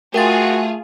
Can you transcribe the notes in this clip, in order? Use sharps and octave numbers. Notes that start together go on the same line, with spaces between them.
A3 F4 F#4 G#4 A#4 G5 A6